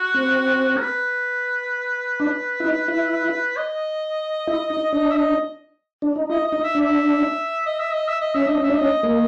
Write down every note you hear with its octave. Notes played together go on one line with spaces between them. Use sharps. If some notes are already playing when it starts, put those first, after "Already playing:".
Already playing: F#4
C4
A#4
B4
D4
E4
D#4
E4
D#5
E4
D#4
D4 D#5
E5
D#5
D4
D#4
E4 D#5
D#5
D#4
E5
D4
E5
D#5
E5
D#5
E5
D#5
C#4 E5
D4 D#5
C#4 E5
D4
D#5
C#4
A#3 D#5